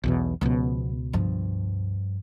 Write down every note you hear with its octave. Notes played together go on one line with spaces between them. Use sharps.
B1 E2 B2
C#2 B2 F3 B3
G2 F3